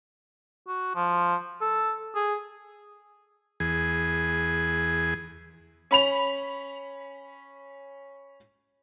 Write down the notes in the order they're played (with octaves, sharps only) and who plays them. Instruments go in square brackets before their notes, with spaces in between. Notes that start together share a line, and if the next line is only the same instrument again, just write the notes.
[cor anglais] F#4
F3
A4
G#4
[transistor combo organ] E2 G#4
[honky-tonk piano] C#4 B5 F7